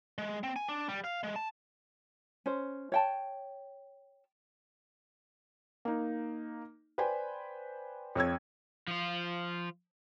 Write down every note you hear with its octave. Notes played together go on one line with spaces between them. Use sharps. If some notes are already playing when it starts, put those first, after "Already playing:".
G#3
C4
G#5
D4
G3
F5
G#3
A5
C#4 C5
C#5 G5 A5
A#3 D#4
B4 C5 D5 G5 G#5
F2 C#5 E6 G#6
F3 F4